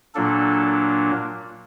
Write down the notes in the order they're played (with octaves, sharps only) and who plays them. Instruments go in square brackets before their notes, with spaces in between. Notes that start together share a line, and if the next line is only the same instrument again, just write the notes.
[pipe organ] A#2 F#3 A#3 D4 A4